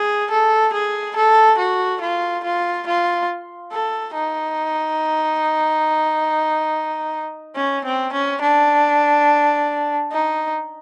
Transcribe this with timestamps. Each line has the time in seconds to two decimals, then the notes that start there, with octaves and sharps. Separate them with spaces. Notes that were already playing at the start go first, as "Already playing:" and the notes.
Already playing: G#4
0.31 A4
0.73 G#4
1.16 A4
1.58 F#4
2.01 F4
2.44 F4
2.87 F4
3.72 A4
4.15 D#4
7.56 C#4
7.85 C4
8.13 C#4
8.42 D4
10.12 D#4